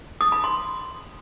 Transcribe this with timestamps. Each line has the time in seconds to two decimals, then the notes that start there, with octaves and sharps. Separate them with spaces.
0.21 D#6
0.32 B5
0.44 C6